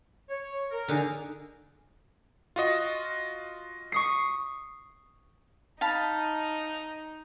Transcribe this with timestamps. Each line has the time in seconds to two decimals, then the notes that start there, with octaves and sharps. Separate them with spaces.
0.29 C#5
0.71 A#4
0.88 D3 D#4 G#4
2.56 F4 F#4 D#5
3.92 C#6 D#6 C7
5.81 D#4 F5 A5 B5